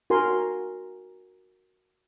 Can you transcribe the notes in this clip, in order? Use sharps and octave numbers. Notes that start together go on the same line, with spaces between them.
F#4 A#4 G#5 C6